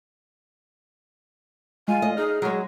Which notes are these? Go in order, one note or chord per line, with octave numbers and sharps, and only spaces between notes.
G#3 F4 G#5
A3 D#5
D#4 G#4 F6
F#3 G#3 C#5